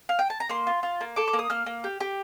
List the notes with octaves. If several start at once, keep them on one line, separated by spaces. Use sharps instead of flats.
F5
G5
A5
A#5
A#3 C6
F4
F4
A#3
A4 D6
D6
A#3
D#6
A#3 F6
A#3
G4
G4